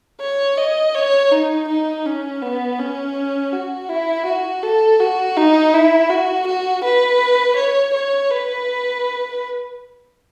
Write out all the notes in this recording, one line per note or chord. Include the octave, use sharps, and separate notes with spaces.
C#5
D#5
C#5
D#4
D#4
C#4
B3
C#4
F#4
E4
F#4
A4
F#4
D#4
E4
F#4
F#4
B4
C#5
C#5
B4